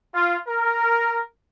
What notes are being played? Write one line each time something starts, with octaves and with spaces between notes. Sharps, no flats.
F4
A#4